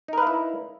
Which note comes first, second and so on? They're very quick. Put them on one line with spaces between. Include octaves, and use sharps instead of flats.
D#4 A#4 B4 F5 E4